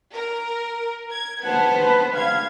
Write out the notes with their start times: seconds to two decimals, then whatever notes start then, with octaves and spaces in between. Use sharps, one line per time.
0.14 A#4
1.12 G#6
1.44 B3 C5 F#5 A5
1.79 B4
2.16 F5 G#6